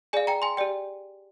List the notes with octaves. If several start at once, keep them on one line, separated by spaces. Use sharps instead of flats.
G#4 D5 F5 G#5
G5 A#5
G#5 C6
G4 D5 G5